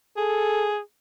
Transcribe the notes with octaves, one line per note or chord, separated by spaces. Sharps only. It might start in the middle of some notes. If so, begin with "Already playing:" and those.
G#4 A4